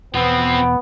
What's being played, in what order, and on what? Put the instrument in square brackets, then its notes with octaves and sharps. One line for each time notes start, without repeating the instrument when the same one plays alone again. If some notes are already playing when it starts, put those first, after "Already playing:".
[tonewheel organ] E2 B2 [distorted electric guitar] F3 C4 [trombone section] B3